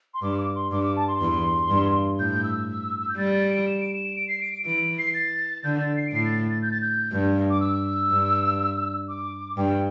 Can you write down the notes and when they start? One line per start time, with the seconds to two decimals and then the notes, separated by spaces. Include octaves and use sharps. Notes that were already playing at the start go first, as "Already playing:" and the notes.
0.14 C6
0.22 G2 D6
0.38 D6
0.55 C6
0.71 G2 D6
0.84 D6
0.96 A5
1.08 C6
1.21 E2
1.70 G2
2.19 A2 G6
2.44 E6
3.00 E6
3.09 G6
3.17 G3 A6
3.34 A6
3.50 D7
3.67 E7
3.80 D7
3.93 E7
4.16 D7
4.28 C7
4.41 D7
4.53 D7
4.65 E3 D7
4.99 C7
5.14 A6
5.64 D3 G6
5.80 A6
5.97 C7
6.08 D7
6.13 A2 C7
6.25 A6
6.50 A6
6.62 G6
6.71 A6
6.81 G6
7.11 G2
7.50 D6
7.60 E6
8.10 G2
9.08 D6
9.57 G2 G5